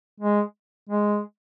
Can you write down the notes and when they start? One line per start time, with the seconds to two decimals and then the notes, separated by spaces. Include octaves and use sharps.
0.20 G#3
0.89 G#3